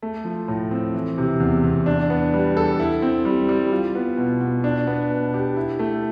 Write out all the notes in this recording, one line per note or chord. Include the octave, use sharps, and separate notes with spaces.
A3
F3
A2
C4
E3
C3
E2
E2
D4
B3
G3
A4
E4
C4
G3
G3
F4
B3
B2
B2
D4
B3
B2
G4
E4
A3